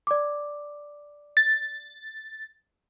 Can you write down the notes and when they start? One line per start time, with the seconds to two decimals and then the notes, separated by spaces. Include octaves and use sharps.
0.07 D5 D6
1.37 A6